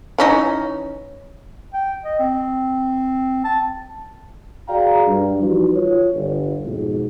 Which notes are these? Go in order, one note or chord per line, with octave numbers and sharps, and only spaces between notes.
E3 C#4 D#4
G5
D#5
C4
A5
F#4 G#4 D5 F5 G5 A#5
G2
E3 F3 G3 D#4 F#4 B4
F4 C#5
G1
F2 G#2 B2